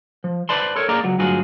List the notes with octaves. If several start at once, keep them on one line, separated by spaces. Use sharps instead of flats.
F3
B4 C5 D5 A5 B5 C6
A4 A#4 C#5
A#3 G#4 A#4 D5 A#5
C#2 F#3
D2 G2 F#3 F4 F#4 G#4